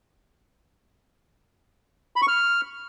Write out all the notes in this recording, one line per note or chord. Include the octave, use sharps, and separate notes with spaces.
B5
C#6
F6